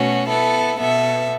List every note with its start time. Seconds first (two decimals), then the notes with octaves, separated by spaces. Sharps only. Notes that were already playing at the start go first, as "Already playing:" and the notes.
Already playing: B2 A3 C#4 F#4
0.28 B3 E4 A4
0.79 B2 B3 A4 E5